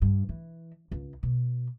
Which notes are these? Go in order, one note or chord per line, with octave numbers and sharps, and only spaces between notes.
G2
E3
C#2
B2